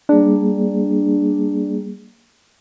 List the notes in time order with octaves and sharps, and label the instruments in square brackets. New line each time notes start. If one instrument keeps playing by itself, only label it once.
[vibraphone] G3 A#3 G#4 [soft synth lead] D4